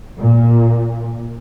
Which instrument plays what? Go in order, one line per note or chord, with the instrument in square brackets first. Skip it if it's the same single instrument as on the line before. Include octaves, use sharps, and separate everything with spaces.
[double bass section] A#2